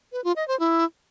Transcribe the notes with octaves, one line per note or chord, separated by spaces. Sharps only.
B4
F4
D#5
C5
E4